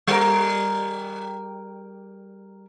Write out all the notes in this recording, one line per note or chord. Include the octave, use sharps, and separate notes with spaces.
G3 A#4